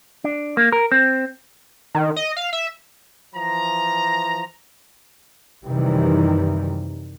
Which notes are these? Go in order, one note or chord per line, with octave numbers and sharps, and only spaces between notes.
D4
A#3
A#4
C4
D#3
D#5
F5
E5
E3 F3 A#5
F#2 C3 D#3 E3 G3